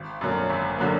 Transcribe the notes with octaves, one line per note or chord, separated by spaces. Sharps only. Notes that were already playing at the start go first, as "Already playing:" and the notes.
Already playing: G#1
F#2 D3 F#3 A#3
G#1
D3 F#3 A#3